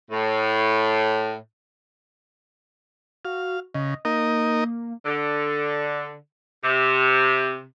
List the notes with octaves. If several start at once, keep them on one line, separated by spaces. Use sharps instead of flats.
A2
F#4 F5
C#3 D#5
A#3 D#4 A#4 D#5
D3
C3